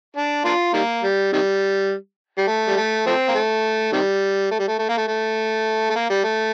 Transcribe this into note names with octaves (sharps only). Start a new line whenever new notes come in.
D4
A#3 D4 F4
D#3 G3 A#3
G3
C3 D#3 G3
G3
A3
G3
A3
F3 A3 C4
A#3
A3
C3 D#3 G3
A3
G3
A3
A3
A#3
A3
A3
A3
A#3
G3
A3